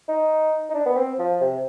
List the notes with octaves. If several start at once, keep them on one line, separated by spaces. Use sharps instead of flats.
D#4
D#4
D4
B3
C4
F3
C3